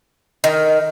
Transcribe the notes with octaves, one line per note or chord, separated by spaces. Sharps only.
D#3